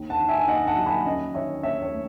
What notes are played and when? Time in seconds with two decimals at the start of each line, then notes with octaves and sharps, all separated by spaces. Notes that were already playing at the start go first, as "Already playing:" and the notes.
Already playing: D#2
0.10 F#5 A5
0.20 D#3
0.29 E5 G#5
0.39 G#5
0.48 D#2 D#5 F#5
0.67 F#5 A5
0.77 F#3
0.86 G#5 B5
1.05 C#4 D#5
1.34 D#3 C#5 E5
1.63 D#2 C#5 E5
1.82 C#5
1.92 A3